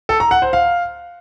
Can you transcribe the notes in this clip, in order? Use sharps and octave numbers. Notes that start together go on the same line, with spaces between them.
A4
A#5
F#5
C5
F5